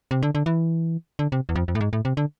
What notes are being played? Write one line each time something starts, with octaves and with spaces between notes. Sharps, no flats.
C3
D3
D3
E3
D3
C3
E2
F2
F2
A2
G#2
A2
C3
D3